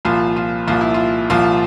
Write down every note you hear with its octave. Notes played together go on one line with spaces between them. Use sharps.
C2 A#2 F3 F4
F4
C2 A#2 F3 F4
E4
F4
C2 A#2 F3 F4